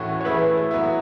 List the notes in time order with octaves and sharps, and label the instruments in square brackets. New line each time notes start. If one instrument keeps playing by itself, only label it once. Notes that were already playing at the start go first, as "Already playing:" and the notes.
Already playing: [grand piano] A2 E3 A3 C#4 F#4
[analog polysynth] C#5
[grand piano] E3 A3 E4 [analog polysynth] G#4 B4
[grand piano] F#3 B3 E4